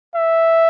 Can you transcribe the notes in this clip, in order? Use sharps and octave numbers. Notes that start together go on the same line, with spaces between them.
E5